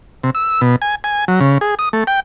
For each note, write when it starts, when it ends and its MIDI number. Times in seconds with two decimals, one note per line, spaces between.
0.23 0.30 48
0.35 0.61 88
0.61 0.76 47
0.82 0.95 80
1.04 1.25 80
1.28 1.40 54
1.41 1.58 49
1.61 1.75 68
1.79 1.89 87
1.93 2.04 57
2.07 2.20 79